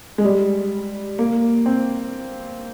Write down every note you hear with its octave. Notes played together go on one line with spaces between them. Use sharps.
G#3
G3
A#3
C4